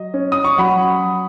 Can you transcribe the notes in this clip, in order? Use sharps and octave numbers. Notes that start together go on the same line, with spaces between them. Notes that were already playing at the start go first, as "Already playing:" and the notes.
Already playing: F#3 D#5
C#4
D#6
C#6
F#3 F#5 B5